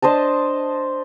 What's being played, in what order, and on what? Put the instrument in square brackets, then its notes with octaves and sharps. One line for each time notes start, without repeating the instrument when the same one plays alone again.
[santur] D4 C5 D#5 A5